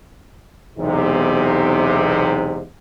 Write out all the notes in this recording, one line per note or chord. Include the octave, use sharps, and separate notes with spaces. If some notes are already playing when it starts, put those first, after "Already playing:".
B1 E2 G#2 C3